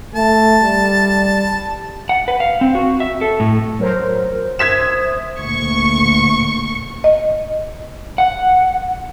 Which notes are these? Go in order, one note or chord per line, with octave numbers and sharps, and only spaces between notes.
A3 A5
G3
F#5
B4
F5
C4
F#4
E5
A4
A2
F#3 A#4 C5
C5 E5 D#6 G#6 B6 E7
D2 A#2 C#6
D#5
F#5